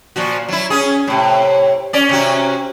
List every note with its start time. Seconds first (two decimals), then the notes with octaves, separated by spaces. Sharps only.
0.16 A#2 F3 F#4
0.48 F#3 E4
0.70 C#4 G#4
1.07 A2 C3
1.93 C#4 D5
2.09 C3 C#4 F#4